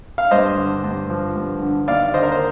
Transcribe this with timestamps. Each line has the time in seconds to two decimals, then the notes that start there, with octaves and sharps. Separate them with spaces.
0.18 F5
0.31 G2 C5 D#5
0.58 D3
0.84 G2
1.10 F3
1.36 G2
1.62 D3
1.88 D#2 D5 F5
2.14 D3 C5 D#5
2.23 A#4
2.32 C5